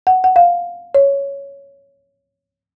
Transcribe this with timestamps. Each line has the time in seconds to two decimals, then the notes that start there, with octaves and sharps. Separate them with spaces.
0.07 F#5
0.24 F#5
0.36 F5
0.95 C#5